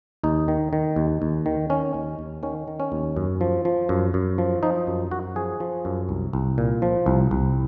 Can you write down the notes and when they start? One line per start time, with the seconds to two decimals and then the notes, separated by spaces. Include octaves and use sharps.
0.23 D#2 D#4
0.48 D#3
0.73 D#3
0.96 D#2
1.22 D#2
1.46 D#3
1.70 D#3 C#4
1.94 D#2
2.19 D#2
2.43 D#3 C#4
2.68 D#3
2.80 C#4
2.92 D#2
3.16 F#2
3.41 F3
3.65 F3
3.89 F#2
4.14 F#2
4.38 F3
4.63 F3 D#4
4.87 F#2
5.11 F#2 F#4
5.36 F3 G#4
5.60 F3
5.85 F#2
6.09 C2
6.33 C2
6.58 A#2
6.82 F3
7.06 C2
7.31 C2